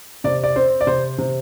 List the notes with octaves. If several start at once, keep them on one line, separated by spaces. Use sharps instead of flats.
C3 D5
D5
C4 C5
D5
C3 C5
C3